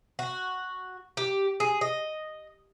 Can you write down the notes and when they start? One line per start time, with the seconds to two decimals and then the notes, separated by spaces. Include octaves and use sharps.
0.19 F#4
1.17 G4
1.60 G#4
1.81 D#5